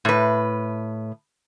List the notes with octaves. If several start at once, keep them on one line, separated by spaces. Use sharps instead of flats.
A2 B4